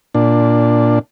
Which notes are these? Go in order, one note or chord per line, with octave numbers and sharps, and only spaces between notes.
A#2 D4